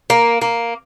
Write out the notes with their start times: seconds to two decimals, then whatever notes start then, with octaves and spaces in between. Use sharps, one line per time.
0.10 A#3
0.41 A#3